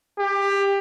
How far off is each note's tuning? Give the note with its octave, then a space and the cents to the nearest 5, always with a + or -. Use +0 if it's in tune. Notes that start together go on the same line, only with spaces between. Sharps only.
G4 +20